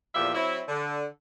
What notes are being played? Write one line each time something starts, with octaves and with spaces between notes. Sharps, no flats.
E2 A#2 F3 G4 E5
F#3 C4 E4
D3